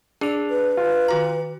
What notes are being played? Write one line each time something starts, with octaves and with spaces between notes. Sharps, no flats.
D4 G#4 C#7 F7
B4
F4
D#3 F#4 A#5